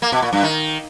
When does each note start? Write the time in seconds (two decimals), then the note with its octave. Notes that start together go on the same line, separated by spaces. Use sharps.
0.02 A#3
0.12 B2
0.22 A#2
0.33 G2
0.43 D#3